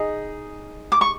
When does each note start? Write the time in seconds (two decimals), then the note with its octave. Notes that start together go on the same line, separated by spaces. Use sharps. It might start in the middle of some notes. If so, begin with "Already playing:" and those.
Already playing: D#4 G#4
0.92 D6
1.01 C#6